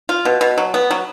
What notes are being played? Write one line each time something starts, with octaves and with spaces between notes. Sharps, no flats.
F4
B2
B2
F#3
B3
F#3